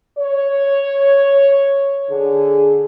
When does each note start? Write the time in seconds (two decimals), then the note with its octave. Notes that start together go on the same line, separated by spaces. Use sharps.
0.18 C#5
2.10 D3 G#4